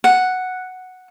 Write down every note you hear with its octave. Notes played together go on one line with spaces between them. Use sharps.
F#5